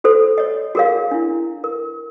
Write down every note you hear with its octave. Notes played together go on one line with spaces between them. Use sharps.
F#4 A4 C5
C#5 D#5
F#4 G#4 A#4 C#5 F5
D4 E4
A#4